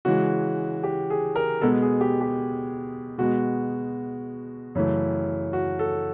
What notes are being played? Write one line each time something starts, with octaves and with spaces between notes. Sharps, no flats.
C#3 E3 G#3 F#4
G4
G#4
A#4
B2 G#3 B3 A4
G#4
G4
G4
B2 G#3 B3 F#4
F#2 C#3 E3 A3
F#4
A4